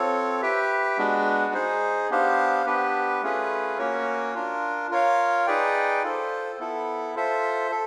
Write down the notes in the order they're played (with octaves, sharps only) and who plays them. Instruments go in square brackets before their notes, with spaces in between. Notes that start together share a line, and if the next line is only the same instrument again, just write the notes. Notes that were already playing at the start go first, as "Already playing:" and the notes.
Already playing: [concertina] C4 F4 A4 C#5
G4 B4 E5 G5
G#3 B3 D4 F#4
D#4 G#4 C5
B3 D4 G4 C5 F5
B3 D4 G4 B4
A3 C#4 F4 G#4 B4
A#3 C#4 F#4 A#4 C#5
D4 F4 A#4
F4 A#4 C#5 F5
D#4 G#4 B4 D5 G5
F4 A4 C5
B3 E4 A4
F4 A4 C5 E5
A4